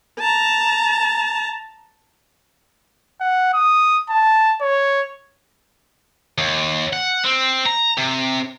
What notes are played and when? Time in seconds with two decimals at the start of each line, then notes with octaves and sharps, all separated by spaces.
0.19 A5 A#5
3.21 F#5
3.54 D#6
4.10 A5
4.62 C#5
6.38 D#2
6.93 F#5
7.25 C4
7.66 A#5
7.98 C3